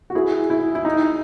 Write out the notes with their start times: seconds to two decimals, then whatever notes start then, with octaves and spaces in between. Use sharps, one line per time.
0.10 F#4
0.15 E4 G#4
0.50 E4
0.75 E4
0.85 D#4